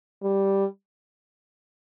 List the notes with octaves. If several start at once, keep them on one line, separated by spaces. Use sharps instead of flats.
G3